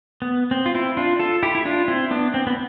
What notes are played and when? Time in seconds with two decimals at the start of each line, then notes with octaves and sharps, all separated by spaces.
0.22 B3
0.51 C4
0.66 F4
0.75 C4 E4
0.97 D4 F4
1.19 F4 A4
1.43 E4 G4
1.55 E4
1.65 D4 F4
1.88 C4 E4
2.11 B3 D4
2.34 C4
2.47 B3